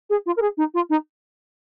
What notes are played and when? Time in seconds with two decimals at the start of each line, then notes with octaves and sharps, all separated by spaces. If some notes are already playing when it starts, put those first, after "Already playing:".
0.10 G#4
0.26 F4
0.37 A#4
0.41 G#4
0.57 D#4
0.74 F4
0.90 D#4